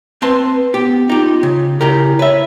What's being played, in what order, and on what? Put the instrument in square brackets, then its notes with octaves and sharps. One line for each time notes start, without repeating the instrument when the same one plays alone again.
[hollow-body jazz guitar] C4 A5 C6 [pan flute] B4
[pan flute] B3 [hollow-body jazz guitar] G4
[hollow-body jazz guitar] D#4 G4 [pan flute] F4
[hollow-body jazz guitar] C#3
[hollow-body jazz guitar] C#3 G4 A#4 [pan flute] E4
[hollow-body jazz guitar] B4 E5 [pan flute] C#5